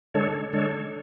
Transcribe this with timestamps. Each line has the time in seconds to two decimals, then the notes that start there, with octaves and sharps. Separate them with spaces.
0.14 D3 G#3 D4 A4 C#5
0.53 D3 G#3 D4 A4 C#5